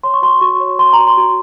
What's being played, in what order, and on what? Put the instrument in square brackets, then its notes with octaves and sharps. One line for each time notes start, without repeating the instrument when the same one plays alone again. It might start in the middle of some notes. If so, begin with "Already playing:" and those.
[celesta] C#5 C6
C#6
F#4 C6
F#4 C#6
C#5
C#5 C6
A#5
F#4
C6
F#4